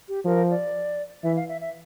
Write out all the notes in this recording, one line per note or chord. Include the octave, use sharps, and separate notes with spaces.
G4
F3 A#4
D5
E3 E5
F5
E5
E5